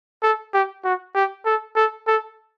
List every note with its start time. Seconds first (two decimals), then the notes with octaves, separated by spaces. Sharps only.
0.23 A4
0.54 G4
0.84 F#4
1.15 G4
1.46 A4
1.76 A4
2.07 A4